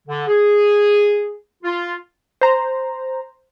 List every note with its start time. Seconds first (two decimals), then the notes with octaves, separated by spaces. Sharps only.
0.08 D3
0.27 G#4
1.64 F4
2.41 C5 A#5